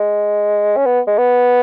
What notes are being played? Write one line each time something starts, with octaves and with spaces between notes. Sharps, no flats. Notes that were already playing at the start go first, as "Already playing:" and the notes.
Already playing: G#3
C#4
B3
G#3
B3